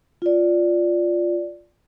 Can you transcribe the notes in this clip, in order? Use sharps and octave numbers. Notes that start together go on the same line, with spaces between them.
F4 D5